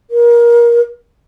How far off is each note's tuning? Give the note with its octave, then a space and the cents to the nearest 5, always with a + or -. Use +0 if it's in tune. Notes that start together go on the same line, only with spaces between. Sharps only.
A#4 +25